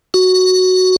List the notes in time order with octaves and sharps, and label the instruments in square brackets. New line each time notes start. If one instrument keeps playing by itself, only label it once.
[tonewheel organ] F#4